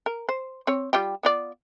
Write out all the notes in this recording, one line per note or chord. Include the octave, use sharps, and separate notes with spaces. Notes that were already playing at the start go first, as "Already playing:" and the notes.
A#4
C5
C4 C#5
G3 F4 G4
B3 F4 D5